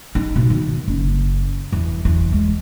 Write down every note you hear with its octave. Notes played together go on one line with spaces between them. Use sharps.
D#4
B2
D#3
F#1
E2
E2
G#3